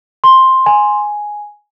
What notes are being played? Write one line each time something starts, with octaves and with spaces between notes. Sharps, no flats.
C6
G#5